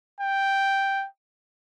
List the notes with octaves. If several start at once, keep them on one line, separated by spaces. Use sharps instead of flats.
G5